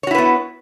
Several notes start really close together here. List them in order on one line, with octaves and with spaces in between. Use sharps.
C#5 F#4 E4 B4 B3